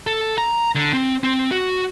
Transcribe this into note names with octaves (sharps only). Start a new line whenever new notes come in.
A4
A#5
D3
C4
C4
F#4